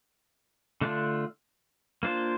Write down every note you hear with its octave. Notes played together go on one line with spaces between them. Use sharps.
D3 A3 D4 F4
A#3 D4 F4 C5